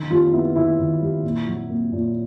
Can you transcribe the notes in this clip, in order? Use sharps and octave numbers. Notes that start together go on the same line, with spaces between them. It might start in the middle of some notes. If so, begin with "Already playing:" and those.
Already playing: D#3
G3 F4
B3 E4
D#3 E4
D#3
G3
A#2
F#3
A#3
A#2